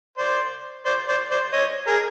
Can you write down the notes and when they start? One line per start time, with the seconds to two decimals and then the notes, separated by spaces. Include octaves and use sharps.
0.18 C5 D5
0.86 C5 D5
1.09 C5 D5
1.31 C5 D5
1.53 C#5 D#5
1.87 G#4 A#4